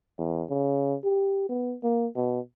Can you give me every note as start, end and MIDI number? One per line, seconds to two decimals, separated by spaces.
0.19 0.44 40
0.50 0.96 49
1.04 1.44 67
1.49 1.75 59
1.83 2.07 58
2.16 2.40 47